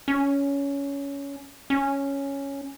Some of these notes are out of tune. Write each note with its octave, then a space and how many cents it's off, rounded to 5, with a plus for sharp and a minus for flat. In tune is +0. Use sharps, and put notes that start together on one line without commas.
C#4 +15
C#4 +0